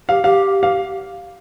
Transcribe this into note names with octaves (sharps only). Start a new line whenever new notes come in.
G4 F5
G4 F5
F5